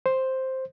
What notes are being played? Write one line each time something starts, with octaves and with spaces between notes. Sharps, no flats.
C5